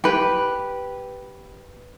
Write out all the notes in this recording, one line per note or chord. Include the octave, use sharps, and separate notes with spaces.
G4 B4